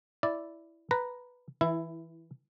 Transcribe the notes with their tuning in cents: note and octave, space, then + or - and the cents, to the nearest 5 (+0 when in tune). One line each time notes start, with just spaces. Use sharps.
E4 +0 D5 -5
B4 +0 A#5 +0
E3 -15 E4 +10